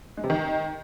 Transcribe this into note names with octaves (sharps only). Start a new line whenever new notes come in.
G#3
C3
D#3